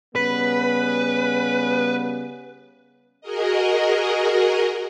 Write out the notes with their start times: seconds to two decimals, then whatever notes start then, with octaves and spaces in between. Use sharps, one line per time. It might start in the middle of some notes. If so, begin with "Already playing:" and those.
0.15 C#3 G3 B3 B4
3.21 F#4 G#4 A#4 D#5